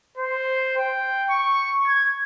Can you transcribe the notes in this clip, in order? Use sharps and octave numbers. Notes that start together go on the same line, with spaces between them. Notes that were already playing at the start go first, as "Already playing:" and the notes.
C5
G5
C#6
G#6